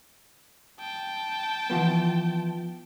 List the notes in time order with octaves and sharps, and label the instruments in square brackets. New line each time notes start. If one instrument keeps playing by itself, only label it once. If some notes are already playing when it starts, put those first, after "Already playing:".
[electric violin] G5 A5
[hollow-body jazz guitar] E3 F3 B3